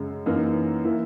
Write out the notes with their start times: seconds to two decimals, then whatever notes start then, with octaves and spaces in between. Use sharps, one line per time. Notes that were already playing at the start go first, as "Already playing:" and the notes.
Already playing: F#2 C#3 G#3
0.26 F#2 E3 A#3 D#4
0.85 E3 A#3 E4